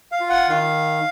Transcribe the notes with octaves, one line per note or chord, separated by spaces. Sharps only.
F5
F4
F#5
D#3 F5